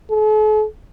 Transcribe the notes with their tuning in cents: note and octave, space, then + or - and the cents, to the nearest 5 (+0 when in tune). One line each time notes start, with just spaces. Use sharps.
A4 -45